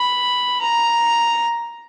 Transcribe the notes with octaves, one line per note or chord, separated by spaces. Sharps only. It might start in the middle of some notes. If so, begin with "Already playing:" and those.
Already playing: B5
A#5